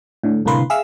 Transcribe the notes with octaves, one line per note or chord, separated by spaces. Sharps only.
A2 D3
C2 A2 D3 A#3 B4 C6
G#4 E5 F5 E6